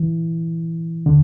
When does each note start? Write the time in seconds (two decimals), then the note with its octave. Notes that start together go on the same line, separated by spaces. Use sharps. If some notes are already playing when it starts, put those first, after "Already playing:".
Already playing: E3
1.06 D3